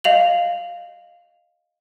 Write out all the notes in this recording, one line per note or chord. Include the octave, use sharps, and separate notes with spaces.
D#5 F5 F7 F#7